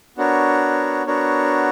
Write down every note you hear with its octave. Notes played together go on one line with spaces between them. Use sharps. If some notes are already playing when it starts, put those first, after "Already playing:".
B3 D4 F#4 A#4 C#5
B3 D4 F#4 A#4 C#5